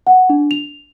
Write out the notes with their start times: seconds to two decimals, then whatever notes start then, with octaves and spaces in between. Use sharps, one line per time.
0.07 F#5
0.29 D4
0.51 F7